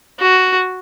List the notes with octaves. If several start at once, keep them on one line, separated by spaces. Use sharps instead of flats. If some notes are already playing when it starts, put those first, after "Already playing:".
F#4